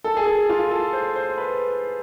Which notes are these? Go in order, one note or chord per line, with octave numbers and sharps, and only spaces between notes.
A4
G#4
A4
F4
A4
C5
C5
B4